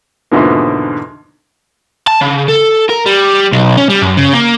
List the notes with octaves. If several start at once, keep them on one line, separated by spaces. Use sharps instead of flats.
E2 G#2 B2 D3 F3 A#3
A5
C#3
A4
A#4
G3
B1
C#4
G3
F#2
C#3
A#3